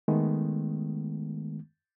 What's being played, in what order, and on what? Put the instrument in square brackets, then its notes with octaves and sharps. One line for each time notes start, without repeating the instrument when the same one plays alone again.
[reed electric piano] D#3 G#3 A3 B3